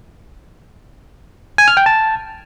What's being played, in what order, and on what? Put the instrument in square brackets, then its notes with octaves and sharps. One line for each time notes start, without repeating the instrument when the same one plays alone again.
[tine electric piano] G#5
F6
G5
A5